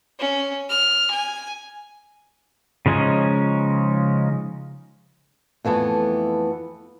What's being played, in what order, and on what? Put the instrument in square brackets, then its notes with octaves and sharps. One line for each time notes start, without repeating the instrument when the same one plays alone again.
[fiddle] C#4
F6
G#5
[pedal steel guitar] C#3 F3 G#3 C#4 D#4
[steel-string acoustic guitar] F2 E3 A3 B3